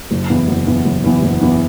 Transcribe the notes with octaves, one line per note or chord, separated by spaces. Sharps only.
F#1
E2 E3 B3
F#1
E2 E3 B3
F#1
E2 E3 B3
F#1
E2 E3 B3